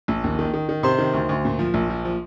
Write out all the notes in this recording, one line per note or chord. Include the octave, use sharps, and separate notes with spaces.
A#1
D#2
D#3
D#3
D#3
C3 C5 C6
D#3
D2
D2
A#2
F3
A#1
F3
F3